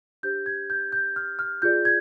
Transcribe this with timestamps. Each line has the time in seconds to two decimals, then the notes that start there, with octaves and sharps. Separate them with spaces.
0.23 D4 G4 C5 G6
0.46 G#6
0.70 G6
0.92 G6
1.16 F6
1.39 F6
1.62 F4 G#4 D5 G6
1.85 G#6